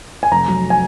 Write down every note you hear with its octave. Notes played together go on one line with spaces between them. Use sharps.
G#5
F1 A#5
F#3
G#5